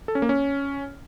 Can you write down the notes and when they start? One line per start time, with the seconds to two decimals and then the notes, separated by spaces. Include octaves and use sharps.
0.08 A4
0.15 C#4
0.22 A#3
0.29 C#4